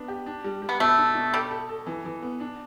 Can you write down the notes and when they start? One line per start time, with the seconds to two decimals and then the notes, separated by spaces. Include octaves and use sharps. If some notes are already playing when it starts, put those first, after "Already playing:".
Already playing: B3 D4
0.08 G4
0.26 D4
0.44 G3
0.62 G3
0.69 B3
0.80 B2 A3
0.98 D4
1.15 B2
1.33 G3 A4
1.51 A4
1.69 A4
1.87 E3
2.05 E3
2.22 B3
2.40 D4